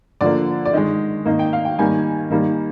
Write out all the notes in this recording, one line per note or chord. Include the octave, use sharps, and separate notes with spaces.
D3 F3 A#3 D5
D5
D#3 G#3 D#5
D#3 A#3 D#5
G5
F5
G5
D#3 G3 A#3 G#5
D#3 G3 A#3